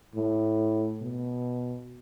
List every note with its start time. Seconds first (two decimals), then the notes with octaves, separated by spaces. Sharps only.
0.15 A2
1.01 B2